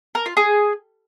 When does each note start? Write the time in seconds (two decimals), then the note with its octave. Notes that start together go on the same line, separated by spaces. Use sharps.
0.15 A#4
0.26 F4
0.37 G#4